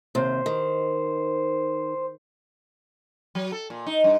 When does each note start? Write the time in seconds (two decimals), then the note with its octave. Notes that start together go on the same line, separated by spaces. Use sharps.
0.15 D#2 C3 C5
0.46 D#3
3.35 F#3
3.52 A4
3.70 A#2
3.86 D#4
4.04 G2